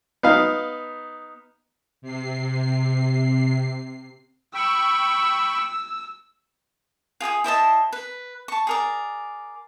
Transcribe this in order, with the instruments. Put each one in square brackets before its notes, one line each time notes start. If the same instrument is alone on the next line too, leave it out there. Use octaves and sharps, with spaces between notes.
[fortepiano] B3 D#4 F5
[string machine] C3 C7
[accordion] G5 B5 C#6 [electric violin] E6
[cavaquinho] F4 G#4 G5 D#6
E4 C5 D#5 A5
B4
A5 C#6
G#4 A#4 D5